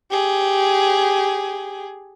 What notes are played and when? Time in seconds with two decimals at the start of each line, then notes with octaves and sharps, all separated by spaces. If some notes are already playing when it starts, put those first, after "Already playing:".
0.11 G4 G#4